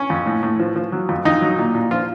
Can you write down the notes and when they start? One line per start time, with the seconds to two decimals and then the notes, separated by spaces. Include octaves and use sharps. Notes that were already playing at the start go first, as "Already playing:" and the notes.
Already playing: C#4
0.10 F2
0.26 A2
0.43 A2
0.59 F3
0.76 F3
0.92 F#3
1.09 F2
1.25 F2 D#4
1.42 F#3
1.58 A#2
1.75 A#2
1.91 F3 F4